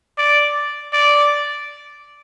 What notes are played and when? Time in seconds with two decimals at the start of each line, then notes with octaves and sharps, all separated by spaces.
0.18 D5
0.93 D5